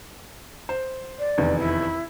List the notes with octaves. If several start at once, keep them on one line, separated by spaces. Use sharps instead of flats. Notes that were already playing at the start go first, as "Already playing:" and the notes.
C5
D5
F1 E2 D#3
E4